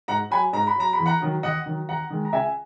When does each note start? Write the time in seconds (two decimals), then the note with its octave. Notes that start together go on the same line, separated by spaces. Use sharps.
0.08 G#2 F#5 A#5
0.30 F#3 G#5 B5
0.53 G#2 A#5
0.67 B5
0.76 F#3 A#5
0.93 B5
0.98 E2
1.06 F#5 A#5
1.21 D#3 F#3
1.43 D#2 D#5 F#5
1.66 D#3 F#3
1.88 D#2 F#5 A#5
2.10 D#3 G#3
2.25 A#5
2.32 C#2 E5 G#5